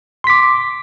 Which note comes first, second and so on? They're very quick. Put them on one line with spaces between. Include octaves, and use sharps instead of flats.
C6 B6 D6